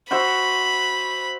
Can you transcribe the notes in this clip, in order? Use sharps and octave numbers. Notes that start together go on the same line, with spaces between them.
F#4 C5 E5 B5